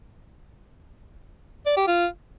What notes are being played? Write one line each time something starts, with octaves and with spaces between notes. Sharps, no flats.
D5
G4
F4